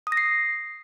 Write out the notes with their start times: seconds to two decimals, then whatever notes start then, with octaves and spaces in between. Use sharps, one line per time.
0.07 D#6
0.12 A#6
0.17 C7